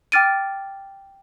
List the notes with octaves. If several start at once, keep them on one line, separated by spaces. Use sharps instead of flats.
G5 D6 F6 A6 D7 D#7